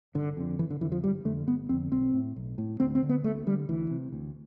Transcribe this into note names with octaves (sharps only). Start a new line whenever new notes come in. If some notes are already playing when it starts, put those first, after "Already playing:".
G1 D3
F2 D3
G1 E3
D3
F2 D3 E3
F3
G1 G3
F2 D3 A3
G1 B3
F2 D3 C4
B1 C4
A2
B1
A2
D2 C4
C4
D3
B3
D2 A3
D3 G3
D2 E3
C3
D2